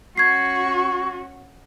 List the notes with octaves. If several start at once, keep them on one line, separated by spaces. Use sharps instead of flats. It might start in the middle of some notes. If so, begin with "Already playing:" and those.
C#4 F#4 C#6 G#6 C7